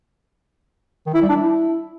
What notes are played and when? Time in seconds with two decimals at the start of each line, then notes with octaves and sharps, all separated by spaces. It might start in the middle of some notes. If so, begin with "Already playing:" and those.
1.07 D#3
1.14 E4
1.21 G3
1.29 D4
1.36 E4